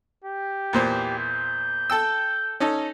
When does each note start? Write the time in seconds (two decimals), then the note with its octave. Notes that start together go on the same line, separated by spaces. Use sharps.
0.24 G4
0.73 E2 A#2 C5
1.19 G6
1.90 A4 G5 E6
2.60 C#4 D#4 A4